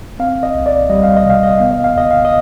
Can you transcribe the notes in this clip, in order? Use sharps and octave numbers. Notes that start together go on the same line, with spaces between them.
C4 F5
D#5
C2
D5
G3 D#5
F5
D#5
C3 F5
D#5
B3 F5
D#5
F5
D2 D#5
F5
D#5